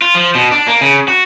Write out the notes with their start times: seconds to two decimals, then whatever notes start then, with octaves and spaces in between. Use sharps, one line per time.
0.02 F4
0.15 F3
0.35 B2
0.51 D4
0.67 A#3
0.81 C#3
1.08 F#4